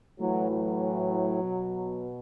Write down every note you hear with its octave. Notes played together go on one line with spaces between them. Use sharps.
A2 E3 F#3
F#3
B2